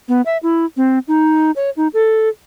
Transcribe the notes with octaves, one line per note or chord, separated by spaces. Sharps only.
B3
E5
E4
C4
D#4
C#5
D#4
A4